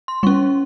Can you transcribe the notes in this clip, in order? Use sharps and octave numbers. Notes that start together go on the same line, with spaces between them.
C6
G3 C#4 C#6